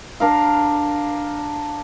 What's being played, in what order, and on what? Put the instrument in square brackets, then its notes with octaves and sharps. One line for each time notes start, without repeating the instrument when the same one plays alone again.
[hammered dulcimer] D4 A#4 F5